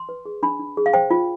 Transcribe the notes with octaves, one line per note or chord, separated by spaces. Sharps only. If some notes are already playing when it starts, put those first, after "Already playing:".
Already playing: C6
B4
G#4
D4 B5
D4
G#4
F5
C5 G5
F4